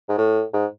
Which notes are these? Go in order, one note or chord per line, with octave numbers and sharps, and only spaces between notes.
G#2
A2
G#2